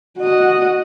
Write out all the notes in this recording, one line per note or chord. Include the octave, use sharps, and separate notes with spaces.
F#4 D#5